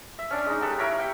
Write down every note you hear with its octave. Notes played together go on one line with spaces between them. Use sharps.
E5
C#4 D4 D5
G#3 D#4
D#4 G4 A4 B4
E4 A#4 C#5 B5
G4 G5